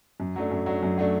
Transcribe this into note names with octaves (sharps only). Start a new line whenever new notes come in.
F#2
F#3 A3 D4
F#2
F#3 A3 D4
F#2
F#3 A3 D4